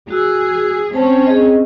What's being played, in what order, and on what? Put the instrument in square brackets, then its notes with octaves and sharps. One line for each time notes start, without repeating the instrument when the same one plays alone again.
[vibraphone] F#4 E6 [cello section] G#4
[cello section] C4 C#4 [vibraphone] C5 A5
[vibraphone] G#4 D#5